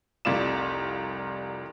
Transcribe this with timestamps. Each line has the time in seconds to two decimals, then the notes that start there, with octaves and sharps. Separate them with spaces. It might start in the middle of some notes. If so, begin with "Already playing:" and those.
0.25 F1 C2 F4 D5 E7